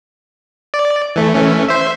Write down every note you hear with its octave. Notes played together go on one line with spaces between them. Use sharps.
D5
E3 A3
E3 A3 C#4
C5 E5